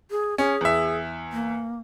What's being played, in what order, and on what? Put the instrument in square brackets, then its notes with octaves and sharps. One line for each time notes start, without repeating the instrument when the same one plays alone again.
[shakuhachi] G#4
[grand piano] C#4 [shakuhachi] G#4
[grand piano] E2 E5
[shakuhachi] A#3